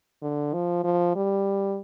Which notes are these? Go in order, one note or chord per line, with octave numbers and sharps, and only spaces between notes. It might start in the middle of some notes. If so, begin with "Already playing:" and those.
D3
F3
F3
G3